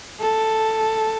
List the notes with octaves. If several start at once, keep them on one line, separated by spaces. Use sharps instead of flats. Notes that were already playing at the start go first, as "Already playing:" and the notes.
A4